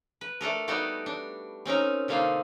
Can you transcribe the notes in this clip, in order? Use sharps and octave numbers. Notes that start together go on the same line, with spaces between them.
B4
A3 D4 A4 A#4
G3 B3 D#4 F#4 G4 A4
D4
C4 C#4 D#4 A#4
B2 D3 A#3 C4 D#4 F4